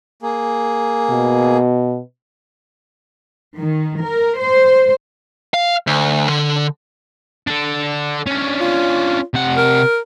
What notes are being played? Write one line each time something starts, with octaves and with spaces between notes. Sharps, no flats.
A#3 G#4
B2
D#3
A#4
C5
F5
D2
D3
D4 A4
C#4 D4
F4
C3 F#5
A#4